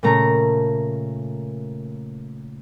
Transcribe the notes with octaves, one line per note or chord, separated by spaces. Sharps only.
A#2 C#3 A3 A#5 A#6